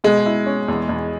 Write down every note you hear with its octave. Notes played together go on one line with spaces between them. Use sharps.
B2 G#3
E4
C#4
E2
E2